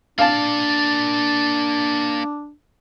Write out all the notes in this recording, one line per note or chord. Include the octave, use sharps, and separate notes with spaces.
A#3 D4 D5 F5 A5